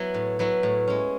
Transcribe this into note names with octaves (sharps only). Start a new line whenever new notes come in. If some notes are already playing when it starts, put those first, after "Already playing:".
Already playing: F#3 B3 E4
A2
F#3 B3 E4
A2
G#3 C#4